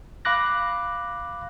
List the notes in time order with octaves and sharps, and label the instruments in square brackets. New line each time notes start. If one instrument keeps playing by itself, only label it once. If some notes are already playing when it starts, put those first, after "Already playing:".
[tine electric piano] F5 B5 D6 F#6 A#6